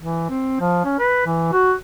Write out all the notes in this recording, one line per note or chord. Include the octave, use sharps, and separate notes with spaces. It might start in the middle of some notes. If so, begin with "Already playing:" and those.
E3
C4
F3
C#4
B4
E3
F#4